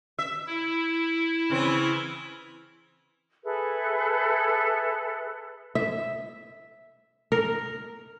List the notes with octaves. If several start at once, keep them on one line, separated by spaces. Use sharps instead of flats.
E5
E4
C#3 E3 C4
G#4 A4 B4 E5
E5
A#4